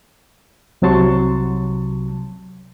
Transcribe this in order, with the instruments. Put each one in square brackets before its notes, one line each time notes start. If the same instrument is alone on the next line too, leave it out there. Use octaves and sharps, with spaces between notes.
[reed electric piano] C2 C3 F#3 A5 C6 C#6